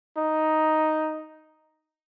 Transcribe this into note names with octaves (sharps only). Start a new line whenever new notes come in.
D#4